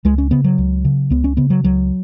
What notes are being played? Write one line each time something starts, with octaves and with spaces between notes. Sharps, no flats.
C#2 G#3
C#4
C#3 B3
F#3
C#2
C#3
C#2 B3
C#4
C#3 B3
F#3
C#2 F#3